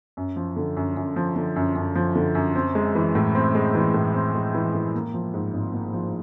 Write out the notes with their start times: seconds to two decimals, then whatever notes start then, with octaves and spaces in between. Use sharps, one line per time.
0.17 F#2
0.36 F3
0.56 D3
0.77 F#2
0.97 F#2
1.16 F3
1.36 D3
1.56 F#2
1.76 F#2
1.95 F3
2.15 D3
2.35 F#2
2.55 C4
2.75 G#3
2.95 E3
3.15 A2
3.35 C4
3.55 G#3
3.75 E3
3.94 A2
4.14 C4
4.35 G#3
4.55 E3
4.74 A2
4.95 A#3
5.14 F3
5.34 G#2
5.54 G#1
5.73 A#3
5.94 F3